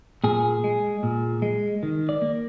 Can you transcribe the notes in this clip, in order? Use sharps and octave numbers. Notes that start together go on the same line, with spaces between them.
A#2 G#4
G#3
A#2
G#3
D#3
D5
A#3